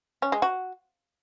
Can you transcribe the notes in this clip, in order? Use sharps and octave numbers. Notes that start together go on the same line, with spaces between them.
C#4
G#3
F#4